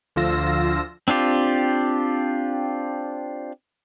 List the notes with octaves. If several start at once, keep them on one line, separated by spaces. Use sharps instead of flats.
D2 D3 F3 F4 E6 A#6
C4 D4 F4 G4